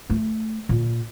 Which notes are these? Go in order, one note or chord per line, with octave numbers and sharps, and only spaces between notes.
A3
A#2